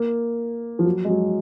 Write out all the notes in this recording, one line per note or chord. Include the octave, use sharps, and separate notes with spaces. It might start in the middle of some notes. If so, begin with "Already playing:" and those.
Already playing: A#3
F3
F#3
G#3
F#3